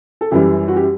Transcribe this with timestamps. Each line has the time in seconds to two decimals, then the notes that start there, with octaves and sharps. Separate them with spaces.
0.21 A4
0.31 F#2 E3 G3 G4
0.68 F#4
0.76 G4